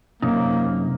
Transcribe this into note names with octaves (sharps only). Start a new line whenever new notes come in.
F#2 C3 A#3 D#4